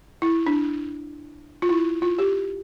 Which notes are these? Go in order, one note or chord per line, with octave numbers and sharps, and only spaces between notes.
E4
D4
F4
E4
F4
G4